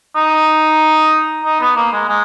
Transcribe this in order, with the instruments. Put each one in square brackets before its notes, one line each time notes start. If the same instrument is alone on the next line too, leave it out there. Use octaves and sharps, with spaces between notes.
[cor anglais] D#4
D#4
B3
A#3
G#3
G#3